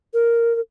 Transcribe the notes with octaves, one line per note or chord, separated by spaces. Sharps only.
A#4
A#4